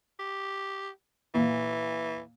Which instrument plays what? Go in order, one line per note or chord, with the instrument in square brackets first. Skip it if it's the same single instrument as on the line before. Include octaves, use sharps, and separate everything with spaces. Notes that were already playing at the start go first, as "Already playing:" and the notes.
[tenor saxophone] G4
[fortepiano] A#2 [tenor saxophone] E3